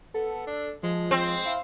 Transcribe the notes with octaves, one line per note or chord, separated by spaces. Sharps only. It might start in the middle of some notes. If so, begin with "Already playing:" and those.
B3 A4
D4
F3 G#3
C4
E4 F5